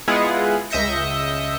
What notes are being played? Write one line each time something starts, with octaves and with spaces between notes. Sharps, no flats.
G#3 B3 E4 F4 G#4 F#5
C#2 D#5 E5 G6 A#6 C#7